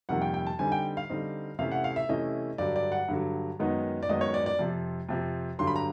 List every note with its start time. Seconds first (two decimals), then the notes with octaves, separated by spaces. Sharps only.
0.09 F2 C3 D#3 G3 A#3 F#5
0.22 G5
0.34 G5
0.47 A5
0.59 D3 G3 C4 D#4 G#5
0.72 G5
0.97 F5
1.10 D3 G3 C4 D#4
1.59 C3 E3 A3 C#4 E4 F5
1.71 F#5
1.84 F5
1.96 E5
2.09 C3 E3 A3 C#4 E4 D#5
2.58 G2 D3 F#3 D5
2.76 D5
2.92 F#5
3.08 G2 D3 F#3
3.59 F#2 D#3 G#3 B3 D#4
4.03 D5
4.09 F#2 D#3 G#3 B3 D#4 D#5
4.21 C#5
4.34 D5
4.46 D5
4.59 F2 C3 F3
5.09 F2 C3 F3
5.59 G2 D3 F#3 C6
5.67 B5
5.76 A#5